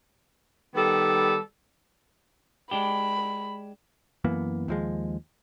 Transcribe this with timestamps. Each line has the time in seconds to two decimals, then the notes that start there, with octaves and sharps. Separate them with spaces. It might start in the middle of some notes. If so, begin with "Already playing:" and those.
0.75 D#3 G3 B3 A4
2.71 G#3 D4 G4 B5
4.24 F#2 E3 A#3 B3
4.68 D#2 F3 G#3